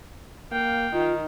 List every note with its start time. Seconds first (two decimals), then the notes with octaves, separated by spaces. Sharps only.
0.52 A#3 F5 G5
0.93 D#3 D#4 F4